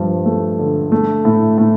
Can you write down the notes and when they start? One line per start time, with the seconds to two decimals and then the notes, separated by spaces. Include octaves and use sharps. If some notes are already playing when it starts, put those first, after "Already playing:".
Already playing: G2 F3
0.26 A3
0.58 D3
0.92 A3
1.25 A2
1.58 A2